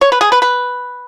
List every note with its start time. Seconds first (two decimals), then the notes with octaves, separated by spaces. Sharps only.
0.01 C#5
0.12 B4
0.21 G#4
0.32 B4
0.42 B4